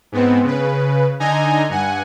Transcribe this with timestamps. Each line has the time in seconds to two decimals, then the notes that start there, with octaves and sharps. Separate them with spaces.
0.12 G#2 B3 C4
0.44 C#3 B4
1.20 D3 D#4 D#5 G#5 A#5
1.70 G2 F#5 G#5